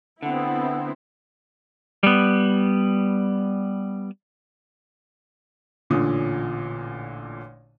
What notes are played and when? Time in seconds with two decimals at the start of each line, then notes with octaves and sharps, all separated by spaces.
0.23 D3 B3 C4 E4 F#5
2.03 G3 B3
5.90 A1 A#2 D3 C#4 D#6